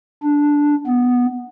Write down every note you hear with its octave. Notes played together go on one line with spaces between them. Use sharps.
D4
B3